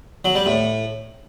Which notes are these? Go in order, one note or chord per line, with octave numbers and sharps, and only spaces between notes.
F#3
G3
A2